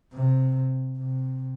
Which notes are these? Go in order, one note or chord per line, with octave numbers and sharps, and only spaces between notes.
C3
C3